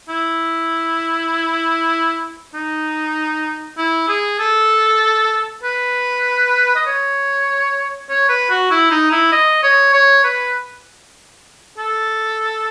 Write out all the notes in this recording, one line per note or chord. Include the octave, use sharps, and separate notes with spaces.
E4
D#4
E4
G#4
A4
B4
D#5
C#5
C#5
B4
F#4
E4
D#4
E4
D#5
C#5
C#5
B4
A4